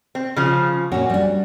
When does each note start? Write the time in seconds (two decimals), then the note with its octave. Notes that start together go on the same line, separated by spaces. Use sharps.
0.15 C4
0.36 C#3 F3
0.92 A#2 C#4 F#4
1.10 G3 D4